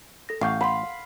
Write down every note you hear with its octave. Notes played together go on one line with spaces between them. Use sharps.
A4 A#6
A1 F5 F#5 C#6 G6
F#5 B5 C6